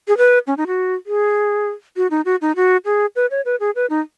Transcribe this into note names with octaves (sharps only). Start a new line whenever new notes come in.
G#4
B4
C#4
D#4
F#4
G#4
F#4
D#4
F#4
D#4
F#4
G#4
B4
C#5
B4
G#4
B4
D#4